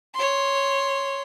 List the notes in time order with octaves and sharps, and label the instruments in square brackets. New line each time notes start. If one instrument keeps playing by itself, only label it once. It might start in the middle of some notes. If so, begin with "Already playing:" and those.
[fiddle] C#5 C6